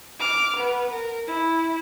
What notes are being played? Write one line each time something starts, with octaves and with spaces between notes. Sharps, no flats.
D6 F6
B3
A#4
E4